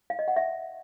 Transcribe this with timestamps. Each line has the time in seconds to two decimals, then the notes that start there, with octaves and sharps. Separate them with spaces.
0.10 F5
0.19 D#5
0.28 F#5
0.36 E5